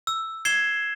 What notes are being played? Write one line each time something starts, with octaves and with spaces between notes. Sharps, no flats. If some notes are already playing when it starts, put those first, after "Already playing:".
E6
G#6 C7 E7 G7